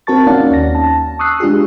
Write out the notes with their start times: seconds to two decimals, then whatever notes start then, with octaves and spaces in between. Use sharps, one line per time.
0.07 C4 F#4 A#4 A5 C#6 A6
0.27 A#3 C#4 D#4 D5 F5 F#5
0.51 D#2 A#6
0.75 A5
1.19 C#6 D#6 E6 F#6 C7
1.40 G#3 D4 F4 G4 G#4